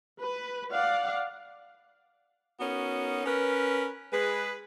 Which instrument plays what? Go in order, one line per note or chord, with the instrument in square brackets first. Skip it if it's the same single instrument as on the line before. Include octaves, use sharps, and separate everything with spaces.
[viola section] B4
D5 F5 F#5
[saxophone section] B3 C#4 D#4 F#4 A#4
C#4 A#4 B4
G#3 G#4 B4